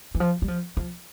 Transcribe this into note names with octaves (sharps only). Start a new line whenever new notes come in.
E3
F3
G3
F3
F3